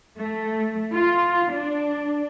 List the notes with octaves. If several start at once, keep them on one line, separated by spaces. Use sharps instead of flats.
A3
F4
D4